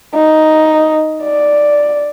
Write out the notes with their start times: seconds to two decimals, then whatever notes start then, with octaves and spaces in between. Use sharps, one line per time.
0.15 D#4
1.24 D5